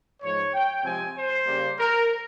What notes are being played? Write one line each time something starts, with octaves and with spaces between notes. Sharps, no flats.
G#2 F3 G#3 C#5
G5
C3 F3 G#3 C4 G#5
C5
C#3 G3 A#3
A#4